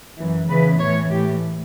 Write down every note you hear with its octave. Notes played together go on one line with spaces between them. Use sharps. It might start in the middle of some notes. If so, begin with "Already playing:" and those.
F#2 E3
E2 C#3 E3 B4
A2 E3 C#5
A2 E3 G4